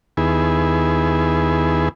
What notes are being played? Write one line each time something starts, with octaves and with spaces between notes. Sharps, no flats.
D#2 B3 E4 G#4